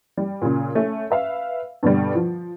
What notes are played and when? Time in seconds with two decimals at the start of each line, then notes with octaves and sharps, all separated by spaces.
0.18 G3
0.42 A#2 C#3
0.75 A3 C#4
1.11 B4 E5 F5
1.83 G2 B2 D3 G3
2.15 F3